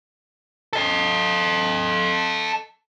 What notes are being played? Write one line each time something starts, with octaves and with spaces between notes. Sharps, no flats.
A4 D#5